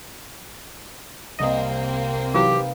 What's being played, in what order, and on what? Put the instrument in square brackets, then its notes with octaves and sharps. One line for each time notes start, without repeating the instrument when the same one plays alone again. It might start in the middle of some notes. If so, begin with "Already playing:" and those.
[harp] C2 E7 [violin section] A#3 C4 [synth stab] D#5
[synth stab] E3 F#3 [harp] D#4 B4 F5 [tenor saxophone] G4